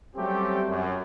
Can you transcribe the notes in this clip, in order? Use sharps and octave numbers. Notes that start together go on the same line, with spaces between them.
F#3 G3 A3 C4 C#4 G4
F#2